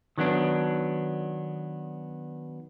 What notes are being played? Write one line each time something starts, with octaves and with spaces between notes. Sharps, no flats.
D#3 F#3 B3 D4